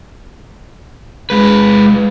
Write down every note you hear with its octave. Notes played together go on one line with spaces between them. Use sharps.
G#3 B4